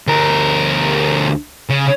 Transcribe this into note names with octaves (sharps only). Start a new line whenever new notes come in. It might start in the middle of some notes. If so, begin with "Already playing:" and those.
D2 A#4
C#3